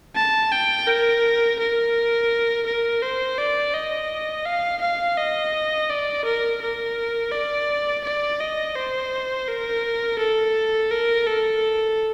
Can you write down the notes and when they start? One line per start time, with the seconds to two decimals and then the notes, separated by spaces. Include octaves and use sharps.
0.16 A5
0.52 G5
0.87 A#4
1.59 A#4
2.66 A#4
3.02 C5
3.38 D5
3.74 D#5
4.46 F5
4.81 F5
5.18 D#5
5.90 D5
6.25 A#4
6.61 A#4
7.32 D5
8.04 D5
8.40 D#5
8.76 C5
9.48 A#4
10.19 A4
10.91 A#4
11.27 A4